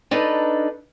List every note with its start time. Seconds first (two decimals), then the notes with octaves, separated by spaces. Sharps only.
0.11 D4 D#4 A4 B4